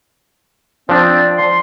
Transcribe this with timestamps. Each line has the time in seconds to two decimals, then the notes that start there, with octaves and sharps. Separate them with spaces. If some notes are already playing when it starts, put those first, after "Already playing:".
0.89 F3 C4 D4 D5
1.38 C6